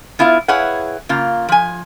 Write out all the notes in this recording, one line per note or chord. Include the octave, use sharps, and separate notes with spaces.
B3 E4 F4 F5
E4 G#4 B4 C#5 F5 F#5
C#3 A#3 F4
F3 G#5